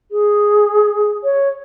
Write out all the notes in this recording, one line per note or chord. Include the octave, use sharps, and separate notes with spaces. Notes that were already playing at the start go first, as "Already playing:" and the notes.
G#4
C#5